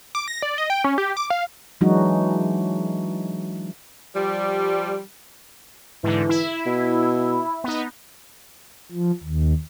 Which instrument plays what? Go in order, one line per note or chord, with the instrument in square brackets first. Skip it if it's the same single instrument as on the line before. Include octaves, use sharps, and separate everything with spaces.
[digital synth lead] D6
A#6
D5
D#5
G5
C#4
G4
D6
F5
[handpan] E3 F#3 G#3 D4 D#4 F#4
[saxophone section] F3 G3
[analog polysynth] G#2 D3 [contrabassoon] E3
[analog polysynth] E4
[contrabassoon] B2
[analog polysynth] B3 D#4
[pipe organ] F3
D#2